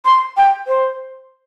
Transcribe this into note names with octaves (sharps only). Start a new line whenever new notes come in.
C6
G5
C5